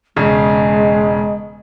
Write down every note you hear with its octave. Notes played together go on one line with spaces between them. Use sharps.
E1 C#3 G#3